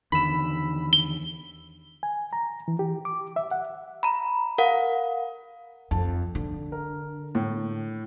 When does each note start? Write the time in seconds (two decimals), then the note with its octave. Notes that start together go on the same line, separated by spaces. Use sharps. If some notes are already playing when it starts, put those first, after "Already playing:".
0.12 E2 D3 D#3 B5 E6
0.93 G7
2.03 G#5
2.33 A#5
2.68 E3
2.79 G4
3.05 D6
3.36 E5
3.51 F#5
4.03 A#5 B5
4.58 A#4 F5 F#5
5.91 F2 A5
6.35 D3
6.72 A#4
7.35 A2